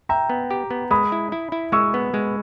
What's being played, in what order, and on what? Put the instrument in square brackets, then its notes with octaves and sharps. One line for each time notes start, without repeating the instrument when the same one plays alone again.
[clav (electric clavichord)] E5 [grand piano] G5 A#5
[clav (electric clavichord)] B3
G4
B3
[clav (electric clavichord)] G#3 [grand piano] B5 D#6
[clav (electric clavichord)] E4
E4
E4
[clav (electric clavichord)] G#3 [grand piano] C#6 E6
[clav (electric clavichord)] B3
G#3